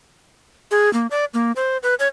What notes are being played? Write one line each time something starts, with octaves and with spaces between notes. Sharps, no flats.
G#4
A#3
D5
A#3
C5
B4
C#5